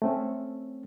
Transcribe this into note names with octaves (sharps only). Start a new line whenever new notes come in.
A3 C4 C#4